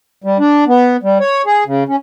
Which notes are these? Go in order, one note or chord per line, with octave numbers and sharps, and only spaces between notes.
G3
D4
B3
G3
C#5
G#4
C#3
C#4